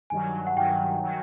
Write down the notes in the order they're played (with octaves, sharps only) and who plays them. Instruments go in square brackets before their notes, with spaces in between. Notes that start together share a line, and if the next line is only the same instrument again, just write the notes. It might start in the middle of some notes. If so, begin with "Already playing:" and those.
[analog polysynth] G2 D#3 F#3 [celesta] G#5
[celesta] F#5
[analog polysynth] G2 D#3 F#3 [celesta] G5
[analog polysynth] D#3 F#3